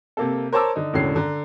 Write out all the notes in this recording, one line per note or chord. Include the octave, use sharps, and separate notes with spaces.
C3 A#3 A4
A#4 C5 C#5 A5 D6 E6
D3 D#4
E1 A2 D3 C#4 C7
D3 A#5